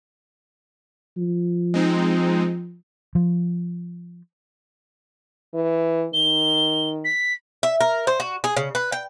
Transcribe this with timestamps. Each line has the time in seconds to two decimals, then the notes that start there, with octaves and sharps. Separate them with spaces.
1.17 F3
1.74 G#3 C4 D#4
3.15 F3
5.54 E3
6.13 D#3 G7
7.04 B6
7.63 E5
7.81 A#4
8.07 C5
8.20 F#4
8.44 G#4
8.57 C#3
8.75 B4
8.92 G5